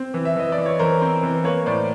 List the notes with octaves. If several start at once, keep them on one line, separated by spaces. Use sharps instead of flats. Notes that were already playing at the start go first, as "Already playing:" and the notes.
Already playing: C4
E3
E5
E3 D#5
D5
E3
C#5
E3 A#4 C5
C4
E3
A#3 B4 C#5
A2 C5 D5